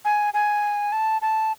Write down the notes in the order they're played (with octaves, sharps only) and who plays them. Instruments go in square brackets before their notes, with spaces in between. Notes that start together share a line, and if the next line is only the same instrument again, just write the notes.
[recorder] G#5
G#5
A5
A5